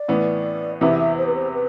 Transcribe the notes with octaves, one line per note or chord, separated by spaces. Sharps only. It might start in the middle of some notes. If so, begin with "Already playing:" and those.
Already playing: D5
A2 E3 B3
E2 C3 E3 B3 E4 E5
E5
C5
B4
C5
B4